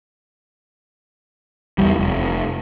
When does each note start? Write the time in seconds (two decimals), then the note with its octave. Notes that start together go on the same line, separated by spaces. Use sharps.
1.78 E2 E3 G3
1.99 F1